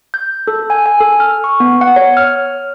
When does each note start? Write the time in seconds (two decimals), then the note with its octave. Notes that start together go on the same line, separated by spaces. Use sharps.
0.14 G6
0.47 A4
0.70 G#5
0.86 G#5
1.00 A4
1.20 F6
1.44 C#6
1.60 B3
1.81 F#5
1.96 C#5
2.17 F6